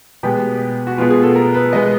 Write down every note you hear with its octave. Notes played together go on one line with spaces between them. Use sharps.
B2 G#3 B3 G4
F#4
B2 G#3 B3 F4
G#4
A4
A#4
B4
B2 G#3 B3 D#5